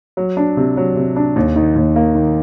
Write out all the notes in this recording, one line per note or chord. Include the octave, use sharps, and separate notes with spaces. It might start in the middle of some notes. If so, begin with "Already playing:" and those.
F#3
D4
C3
F#3
C3
D4
D#2
D#3
D#2
A#3
D#3